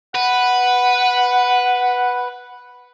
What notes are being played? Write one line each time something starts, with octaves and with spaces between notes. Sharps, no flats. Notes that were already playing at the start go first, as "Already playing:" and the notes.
B4 F#5